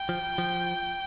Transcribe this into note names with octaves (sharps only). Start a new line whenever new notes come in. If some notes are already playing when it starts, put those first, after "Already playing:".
Already playing: G5
F3
F3